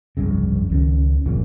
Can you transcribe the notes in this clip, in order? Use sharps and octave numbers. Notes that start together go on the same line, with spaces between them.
F1 C2 G2 C#3
C#2 D#3 C#4
G1 F2 A#2 C#3